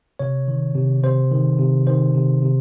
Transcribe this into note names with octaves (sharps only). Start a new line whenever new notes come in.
C3 C#5
D#3
C3
C3 C5
D#3
C3
D#3 C5
C3
C3